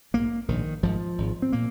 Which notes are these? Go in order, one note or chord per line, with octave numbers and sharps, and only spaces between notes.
A#1 G#2 A#3
A#1 G#2 D#3
G#1 G#2 F3
G#1 G#2
C4
A#2 A#3